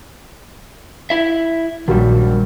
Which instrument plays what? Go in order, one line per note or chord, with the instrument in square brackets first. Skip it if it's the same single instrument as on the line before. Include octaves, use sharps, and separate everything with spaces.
[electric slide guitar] E4 E5
[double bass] A#1 [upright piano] G2 F#3 F#4 [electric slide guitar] D#3 G3